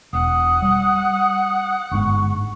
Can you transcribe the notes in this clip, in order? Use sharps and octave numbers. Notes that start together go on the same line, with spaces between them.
E1 F#5 D#6
G3
G1 G#2 G#3 C#6